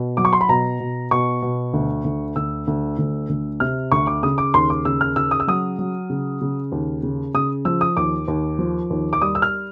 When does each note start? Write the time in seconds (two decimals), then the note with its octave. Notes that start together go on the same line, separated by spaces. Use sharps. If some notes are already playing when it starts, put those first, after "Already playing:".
Already playing: B2
0.17 F#3 D6
0.25 C#6
0.33 C6
0.41 B5
0.49 B2 A#5
0.80 B2
1.11 B2 C#6
1.42 B2
1.73 D2
2.04 D2
2.36 D2 E6
2.67 D2
2.98 D2
3.29 D2
3.60 C3 F6
3.92 D2 C#6
4.07 D6
4.23 C#3 D#6
4.38 D6
4.54 D#2 C6
4.70 D6
4.85 C#3 E6
5.01 F6
5.16 C#3 E6
5.31 D#6
5.40 E6
5.48 F#3 D#6
5.79 F#3
6.10 C#3
6.41 C#3
6.72 D#2
7.03 C#3
7.34 C#3 D#6
7.65 F3 E6
7.81 D#6
7.97 D#2 D6
8.28 D#2
8.59 F3
8.90 D#2
9.13 D6
9.22 G3 D#6
9.35 E6
9.42 F6